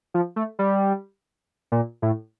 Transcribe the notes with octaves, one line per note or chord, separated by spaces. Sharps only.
F3
A3
G3
A#2
A2